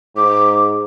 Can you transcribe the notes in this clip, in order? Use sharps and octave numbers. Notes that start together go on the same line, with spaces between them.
G#2 D6